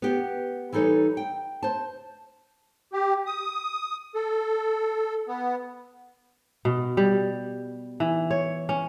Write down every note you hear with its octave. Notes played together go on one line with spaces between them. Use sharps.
B3 G4
E3 G3 D#4 A4 C#5
G5
C5 A5
G4
D#6
A4
B3
B2
G3
E3
C#5
C#4